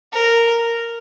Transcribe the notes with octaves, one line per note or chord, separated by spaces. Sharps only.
A#4